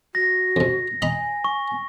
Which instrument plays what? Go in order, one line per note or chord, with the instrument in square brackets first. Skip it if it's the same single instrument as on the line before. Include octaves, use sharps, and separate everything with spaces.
[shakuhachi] F#4 [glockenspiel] A#6
[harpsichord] F2 C3
[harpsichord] D#5 A#5 B5 [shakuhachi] G#5
[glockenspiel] C#6